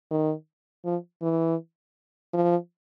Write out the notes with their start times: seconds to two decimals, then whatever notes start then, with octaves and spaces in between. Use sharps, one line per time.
0.11 D#3
0.85 F3
1.22 E3
2.33 F3